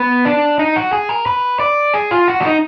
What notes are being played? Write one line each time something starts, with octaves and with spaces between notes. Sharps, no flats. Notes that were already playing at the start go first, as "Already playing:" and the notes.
Already playing: B3
D4
D#4
F#4
G#4
A#4
B4
D5
G#4
F4
F#4
D4
D#4